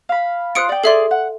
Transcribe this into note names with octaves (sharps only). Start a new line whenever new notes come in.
F5 B5
F4 C5 D#6 F#6 C#7 D7
D5 G5
G#4 A4 D5 E5 C6
F#5